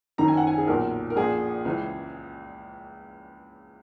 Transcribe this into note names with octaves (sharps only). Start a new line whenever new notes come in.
F#1 F#2 D#3 A#5
G#5
F#5
G#5
G#4
B1 A#2 A#4
A#4
A#1 A#2 G#4
C#2 C#3 E3